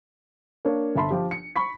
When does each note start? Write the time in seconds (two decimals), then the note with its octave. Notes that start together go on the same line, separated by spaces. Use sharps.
0.65 A#3 D4 C#5
0.95 G1 D4 E5 A5 B5 C6
1.11 F3 G4
1.31 C#7
1.56 B5 C#6 B6